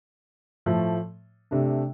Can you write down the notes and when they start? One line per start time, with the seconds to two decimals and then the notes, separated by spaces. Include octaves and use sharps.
0.66 A2 F3 A3
1.51 C3 A3 D4